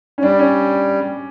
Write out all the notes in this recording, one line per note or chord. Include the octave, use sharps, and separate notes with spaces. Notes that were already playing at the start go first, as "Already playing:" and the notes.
C#4
G3 D4
C#4